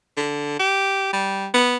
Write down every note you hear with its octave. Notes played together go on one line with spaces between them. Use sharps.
D3
G4
G3
B3